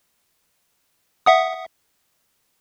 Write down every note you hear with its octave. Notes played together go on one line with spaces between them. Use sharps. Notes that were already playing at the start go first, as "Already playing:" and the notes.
E5 F#5 D#6